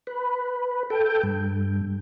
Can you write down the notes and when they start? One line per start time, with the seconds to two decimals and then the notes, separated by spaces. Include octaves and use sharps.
0.07 B4
0.90 A4 G5
1.23 G2